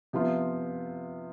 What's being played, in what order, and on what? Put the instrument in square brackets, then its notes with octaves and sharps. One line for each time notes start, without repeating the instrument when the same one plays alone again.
[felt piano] C3 F3 B3 F4